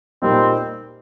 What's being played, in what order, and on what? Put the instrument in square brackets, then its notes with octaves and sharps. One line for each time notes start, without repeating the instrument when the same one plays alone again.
[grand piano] A#2 G3 A#3 D#4 [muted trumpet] C4